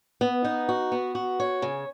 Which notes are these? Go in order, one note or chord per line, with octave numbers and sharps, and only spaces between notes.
B3
D#4
F#4
B3
F#4
C#5
C#3